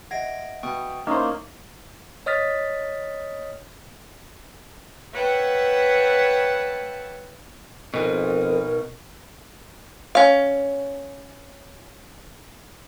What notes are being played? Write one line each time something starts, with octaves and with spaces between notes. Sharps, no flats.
D#5 E5 F#5 G#6 A#6 D7
B2 G5 C#6 D#6
A#3 C#4 D#4 E4 C5 D#5 C#6 D#6
C#5 D#5 D#6 F6 A6 B6
B4 C#5 E5 F#5 G5 A5
F2 B2 D#4 A#4
C#4 F5